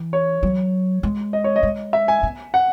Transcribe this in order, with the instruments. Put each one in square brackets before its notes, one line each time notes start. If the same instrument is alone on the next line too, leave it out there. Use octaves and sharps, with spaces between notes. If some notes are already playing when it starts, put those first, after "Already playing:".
Already playing: [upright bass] E3
[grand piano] C#5
[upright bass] F#3
G#3
[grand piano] D#5
C#5
D#5
[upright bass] G#3
[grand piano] E5
G#5
[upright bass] B3
[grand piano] F#5